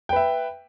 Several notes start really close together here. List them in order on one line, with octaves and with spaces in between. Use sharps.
G5 B4 E5